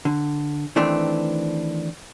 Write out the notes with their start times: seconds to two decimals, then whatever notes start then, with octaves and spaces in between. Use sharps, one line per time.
0.05 D3
0.76 D#3 E3 A3 C4 D4